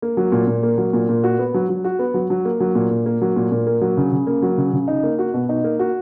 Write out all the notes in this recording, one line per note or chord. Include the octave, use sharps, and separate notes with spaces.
A#3
F#3
A#2
A#2
A#3
F#3
A#2
A#2
F#4
B3
F#3
F#3
F#4
B3
F#3
F#3
A#3
F#3
A#2
A#2
A#3
F#3
A#2
A#2
A#3
F#3
C#3
C#3
A#3
F#3
C#3
C#3
D#4
A#3
F#4
B2
D#4
A#3
F#4